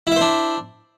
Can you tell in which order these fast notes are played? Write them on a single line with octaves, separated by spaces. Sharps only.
E4 E5 C5 D4